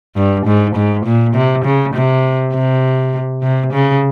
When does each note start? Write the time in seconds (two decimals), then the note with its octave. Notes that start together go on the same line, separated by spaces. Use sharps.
0.16 G2
0.46 G#2
0.76 G#2
1.06 A#2
1.34 C3
1.65 C#3
1.94 C3
2.54 C3
3.43 C3
3.73 C#3